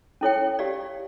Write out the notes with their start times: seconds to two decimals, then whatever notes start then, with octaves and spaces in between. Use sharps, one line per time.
0.21 C#4 E4 A4 C#5 G5
0.59 G4 D5 F5